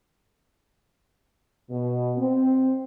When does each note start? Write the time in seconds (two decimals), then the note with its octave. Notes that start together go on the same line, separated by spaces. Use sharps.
1.70 B2
2.18 C4